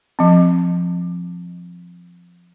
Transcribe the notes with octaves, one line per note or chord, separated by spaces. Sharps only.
F3 C4